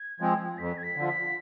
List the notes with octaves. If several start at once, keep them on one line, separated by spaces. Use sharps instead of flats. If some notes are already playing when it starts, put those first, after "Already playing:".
Already playing: G#6
F3 G#3 C4
F2 B6
G#6
B6
D3 F3
B6